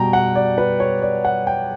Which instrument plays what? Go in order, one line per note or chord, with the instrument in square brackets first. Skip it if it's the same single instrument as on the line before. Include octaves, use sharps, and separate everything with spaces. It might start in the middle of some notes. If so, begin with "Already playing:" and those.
Already playing: [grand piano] B2 G3 G5 A#5
F#5
D5
B4
C#5
D5
F#5
G5